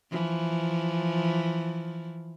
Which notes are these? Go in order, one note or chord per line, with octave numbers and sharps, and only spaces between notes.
E3 F3